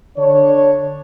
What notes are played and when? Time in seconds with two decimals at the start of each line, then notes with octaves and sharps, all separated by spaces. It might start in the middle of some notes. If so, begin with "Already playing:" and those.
0.17 D3 D4 C#5